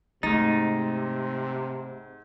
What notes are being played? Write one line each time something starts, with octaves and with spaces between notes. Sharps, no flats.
G#2 C3 A3 D#4 A6